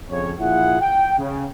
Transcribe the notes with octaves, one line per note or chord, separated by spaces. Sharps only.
F2 C#3 C#5
A#1 E4 F4 G#4 F#5
G5
C#3